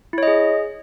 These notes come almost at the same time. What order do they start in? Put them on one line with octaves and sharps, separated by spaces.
E4 C#5 D#5 G#4